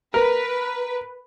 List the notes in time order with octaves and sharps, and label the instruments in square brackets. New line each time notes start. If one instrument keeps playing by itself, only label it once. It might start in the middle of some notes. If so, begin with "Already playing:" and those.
[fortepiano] A#4 [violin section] B4